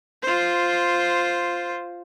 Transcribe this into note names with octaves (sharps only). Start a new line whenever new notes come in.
F4 C5